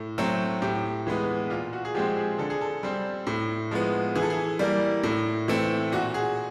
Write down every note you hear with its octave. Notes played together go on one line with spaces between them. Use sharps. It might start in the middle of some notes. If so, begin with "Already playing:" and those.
Already playing: A2
F#3 A3 C4
A2 G4
E3 G#3 B3
A#2 F4
F#4
G#4
F3 G#3 C4 G4
G#4
D3 A4
G#4
A4
G3 C4
A2
F3 G#3 B3
E3 G#4
A4
G#4
G3 A#3
A2
E3 A3 C4
A#2 F#4
G#4